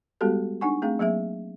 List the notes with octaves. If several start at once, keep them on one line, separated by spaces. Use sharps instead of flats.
G3 G#3 B3 F#4 G4 A4
D4 D#4 F#5 G#5 C#6
A3 C4 G#4 F5
F#3 A#3 G#4 E5